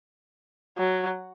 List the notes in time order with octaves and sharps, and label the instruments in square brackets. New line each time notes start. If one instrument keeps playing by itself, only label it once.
[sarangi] F#3